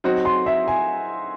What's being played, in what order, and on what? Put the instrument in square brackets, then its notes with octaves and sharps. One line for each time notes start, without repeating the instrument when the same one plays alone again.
[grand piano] F#3 C4 D#4 F#4
[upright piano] C6
E5
G#5